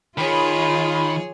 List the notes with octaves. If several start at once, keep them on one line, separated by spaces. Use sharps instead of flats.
D#3 F4 G#4 C#5 B5